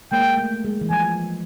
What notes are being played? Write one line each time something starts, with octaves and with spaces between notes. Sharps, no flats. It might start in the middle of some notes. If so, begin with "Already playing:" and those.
G#3 A#3 G5
A3
G#3
E3
F3 G#5